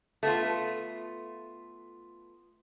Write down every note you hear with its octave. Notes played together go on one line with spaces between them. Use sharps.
A3 B3 F4